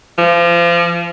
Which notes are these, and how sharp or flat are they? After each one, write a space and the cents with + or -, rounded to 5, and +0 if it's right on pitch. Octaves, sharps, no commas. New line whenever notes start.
F3 -30